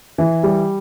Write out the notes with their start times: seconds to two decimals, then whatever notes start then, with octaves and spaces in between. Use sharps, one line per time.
0.18 E3
0.43 G3